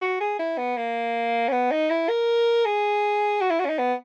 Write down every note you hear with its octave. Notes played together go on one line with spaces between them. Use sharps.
F#4
G#4
E4
B3
A#3
C#4
B3
D#4
E4
A#4
G#4
F#4
E4
F#4
C#4
D#4
B3